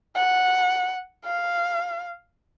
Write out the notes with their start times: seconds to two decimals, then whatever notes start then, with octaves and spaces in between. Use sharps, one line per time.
0.16 F#5
1.25 F5